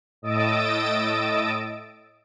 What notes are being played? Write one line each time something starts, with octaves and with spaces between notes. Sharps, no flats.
A2 D#5 D#6 E6 A6 D7